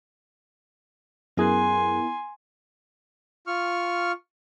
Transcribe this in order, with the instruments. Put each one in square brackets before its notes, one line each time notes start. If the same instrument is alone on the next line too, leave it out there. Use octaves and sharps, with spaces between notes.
[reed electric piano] F#2 G#4 F#6 [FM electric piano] B3 E4 A#4 [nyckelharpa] G#5 C6
[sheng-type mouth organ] F4 C#6 F6